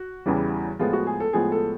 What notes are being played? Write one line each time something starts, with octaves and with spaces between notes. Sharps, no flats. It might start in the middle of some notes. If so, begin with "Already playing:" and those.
Already playing: F#4
E2 C#3 E3 G3
A2 F3 G#3 B3 F4
F#4
G#4
A4
A2 F3 G#3 B3 G#4
A4